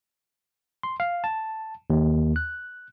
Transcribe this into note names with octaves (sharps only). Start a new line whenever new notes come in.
C6
F5
A5
D#2
F#6